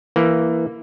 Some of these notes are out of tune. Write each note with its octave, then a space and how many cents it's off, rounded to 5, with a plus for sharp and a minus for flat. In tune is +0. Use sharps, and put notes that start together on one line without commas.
E3 +10 A#3 +0